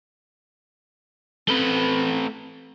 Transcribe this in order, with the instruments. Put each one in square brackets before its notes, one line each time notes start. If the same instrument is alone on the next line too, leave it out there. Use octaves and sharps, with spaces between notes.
[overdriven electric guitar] A3 B4 [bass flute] C4